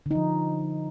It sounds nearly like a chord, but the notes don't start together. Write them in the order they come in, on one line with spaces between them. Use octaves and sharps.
D3 D#4 F3